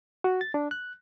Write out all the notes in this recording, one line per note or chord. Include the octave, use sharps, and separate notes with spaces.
F#4
A6
D4
F#6